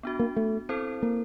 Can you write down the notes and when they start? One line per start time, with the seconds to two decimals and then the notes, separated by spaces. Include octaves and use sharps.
0.03 B3 D4 F#4
0.19 A#3
0.36 A3
0.69 C4 E4 A4 C5
1.02 A#3